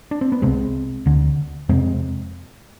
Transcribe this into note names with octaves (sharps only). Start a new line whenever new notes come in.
D4
C4
B3
C2 C3 G#3 C4
D2 D3
F2 C3 G#3 C4